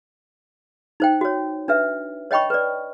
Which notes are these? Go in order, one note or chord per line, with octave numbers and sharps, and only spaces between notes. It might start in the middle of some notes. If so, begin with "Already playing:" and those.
D#4 C5 G5
F#4 C#5
D4 B4 E5
C#5 D#5 G5 B5 C#6
B4 D5